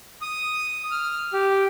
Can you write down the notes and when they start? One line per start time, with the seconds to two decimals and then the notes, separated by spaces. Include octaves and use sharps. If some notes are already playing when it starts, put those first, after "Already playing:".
0.22 D#6
0.91 F6
1.33 G4